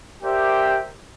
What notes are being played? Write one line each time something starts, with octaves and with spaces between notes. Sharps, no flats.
G4 A#4 C5 D5 E5 G5